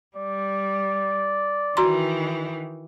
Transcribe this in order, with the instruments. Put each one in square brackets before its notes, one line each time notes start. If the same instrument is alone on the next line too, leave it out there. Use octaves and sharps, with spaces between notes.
[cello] G3 [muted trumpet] D5
[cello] D#3 E3 [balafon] F#4 A#5 C6